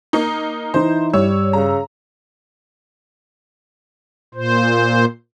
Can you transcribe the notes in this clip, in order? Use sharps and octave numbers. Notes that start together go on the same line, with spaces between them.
A#3 D#4
E3 D#4 E4 C5
G2 G3 C#5 E6
C#3 A#5
A#2 C5